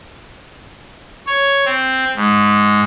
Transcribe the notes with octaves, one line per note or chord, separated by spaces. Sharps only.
C#5
C4
G#2